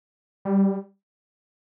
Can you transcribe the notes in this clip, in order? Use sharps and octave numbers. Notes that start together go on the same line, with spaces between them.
G3